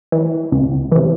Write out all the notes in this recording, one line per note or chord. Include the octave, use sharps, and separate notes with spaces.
E3
C#2
C3 E3